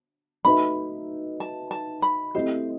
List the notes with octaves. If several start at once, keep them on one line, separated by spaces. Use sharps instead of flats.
A3 D#4 F#4 B4 E5 B5
A5
A5
B5
A3 C4 E4 G4 C5 D#5